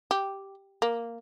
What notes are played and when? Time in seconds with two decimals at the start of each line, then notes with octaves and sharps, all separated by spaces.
0.11 G4
0.82 A#3